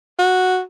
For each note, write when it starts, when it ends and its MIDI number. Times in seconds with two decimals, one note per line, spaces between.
0.19 0.60 66